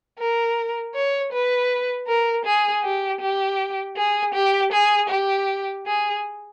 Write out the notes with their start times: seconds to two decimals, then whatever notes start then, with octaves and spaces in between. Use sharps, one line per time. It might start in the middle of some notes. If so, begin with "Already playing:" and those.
0.19 A#4
0.95 C#5
1.32 B4
2.08 A#4
2.45 G#4
2.84 G4
3.21 G4
3.97 G#4
4.34 G4
4.72 G#4
5.10 G4
5.86 G#4